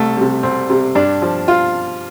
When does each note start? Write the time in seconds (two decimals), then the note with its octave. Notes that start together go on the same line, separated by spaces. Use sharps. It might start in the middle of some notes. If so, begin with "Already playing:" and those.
Already playing: C2 A3
0.17 C3 G3
0.43 C2 C4
0.70 C3 G3
0.95 G2 D4
1.22 F3
1.48 F4